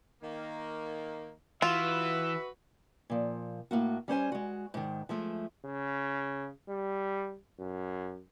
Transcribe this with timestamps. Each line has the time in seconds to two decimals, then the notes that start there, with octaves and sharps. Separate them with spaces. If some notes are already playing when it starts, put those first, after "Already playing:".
0.23 D#3 A#3
1.62 E3 F4 F#4 B4 E5
3.10 A#2 F3
3.71 A2 A#3 F#4
4.08 G3 C#4 C5 G#5
4.32 G#3 F#4
4.74 G#2 D#3
5.09 F3 G#3 A3
5.65 C#3
6.69 G3
7.59 F#2